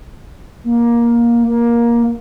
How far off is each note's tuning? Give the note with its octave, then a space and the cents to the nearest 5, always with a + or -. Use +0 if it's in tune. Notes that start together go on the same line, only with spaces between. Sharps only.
A#3 +15
A#3 +15